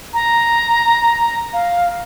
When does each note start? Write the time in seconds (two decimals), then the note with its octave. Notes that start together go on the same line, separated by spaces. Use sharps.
0.14 A#5
1.53 F5